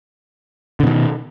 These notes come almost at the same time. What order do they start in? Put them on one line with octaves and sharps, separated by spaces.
D3 B2 D#3